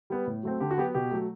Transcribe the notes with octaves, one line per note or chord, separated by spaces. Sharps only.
G3 B3
A2
F#3 A3 C4
D3 G4
F#4
F#3 B3 G4
B2 G4
F#3 A3